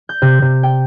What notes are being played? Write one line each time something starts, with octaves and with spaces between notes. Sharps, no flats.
G6
C3
C3
G5